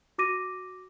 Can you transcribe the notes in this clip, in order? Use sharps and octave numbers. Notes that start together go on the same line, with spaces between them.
F#4 D6 A#6 D#7